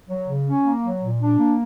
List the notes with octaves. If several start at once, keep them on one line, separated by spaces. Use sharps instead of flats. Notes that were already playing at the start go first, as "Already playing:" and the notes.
F#3
C#3
C#4
A#3
F#3
A#2
D4
A#3